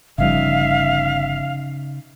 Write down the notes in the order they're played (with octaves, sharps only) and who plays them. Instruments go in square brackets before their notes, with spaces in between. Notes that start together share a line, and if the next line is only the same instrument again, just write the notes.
[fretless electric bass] G1 F3 G3 [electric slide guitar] C#3 D#4 [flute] E5 [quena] F5